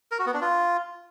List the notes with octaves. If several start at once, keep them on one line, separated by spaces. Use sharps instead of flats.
A#4
F#4
B3
D4
F4